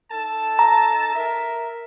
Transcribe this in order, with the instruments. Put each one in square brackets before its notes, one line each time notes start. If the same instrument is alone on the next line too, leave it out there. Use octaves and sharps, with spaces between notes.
[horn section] D#4 A4 A5
[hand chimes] A#5
[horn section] A#4 E5